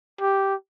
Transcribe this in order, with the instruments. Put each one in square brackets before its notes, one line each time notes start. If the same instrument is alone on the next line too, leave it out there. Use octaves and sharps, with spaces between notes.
[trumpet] G4